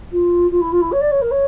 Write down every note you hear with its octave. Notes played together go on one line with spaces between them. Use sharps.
F4
F4
E4
F4
E4
C#5
D5
C#5
A#4
C#5